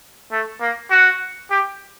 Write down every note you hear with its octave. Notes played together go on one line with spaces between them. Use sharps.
A3
A#3
F#4
G4